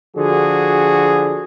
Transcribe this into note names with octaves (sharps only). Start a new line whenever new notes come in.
D3 F3 F#4 G#4